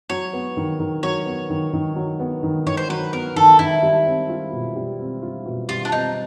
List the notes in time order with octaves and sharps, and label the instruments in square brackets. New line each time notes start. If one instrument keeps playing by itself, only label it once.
[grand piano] F#3 [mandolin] C#5
[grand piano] B3
D#3
D#3
[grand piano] F#3 [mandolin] C#5
[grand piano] B3
D#3
D#3
F#3
B3
D#3
[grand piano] D#3 [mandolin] C#5
[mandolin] C5
[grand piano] F#3 [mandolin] B4
[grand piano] B3 [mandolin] A#4
[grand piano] D#3 [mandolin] A4
[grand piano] D#3 [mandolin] E4
[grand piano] G3
C4
F4
B2
G3
C4
F4
B2
[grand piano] G3 [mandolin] F4
[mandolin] D4
[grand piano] C4 [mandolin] D#4